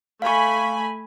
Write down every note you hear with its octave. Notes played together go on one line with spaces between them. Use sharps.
A3 F5 G#5 B5 C#6